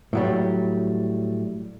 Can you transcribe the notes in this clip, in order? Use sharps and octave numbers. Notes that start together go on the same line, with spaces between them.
A2 F#3 G3